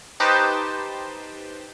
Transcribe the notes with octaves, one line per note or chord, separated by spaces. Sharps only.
D#4 G4 B4 C5 G5 A5